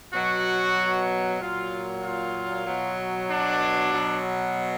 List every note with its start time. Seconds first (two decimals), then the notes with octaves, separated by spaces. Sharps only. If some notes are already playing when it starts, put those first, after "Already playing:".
0.13 B2 F#3 F#4
1.40 A#2 F#3 F4
2.03 F4
2.67 B2 F#3
3.29 D4
3.93 B2 F#3